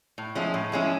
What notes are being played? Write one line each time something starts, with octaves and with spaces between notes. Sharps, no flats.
A2
F3 G#3 C#4 E4
A2
F3 G#3 C#4 E4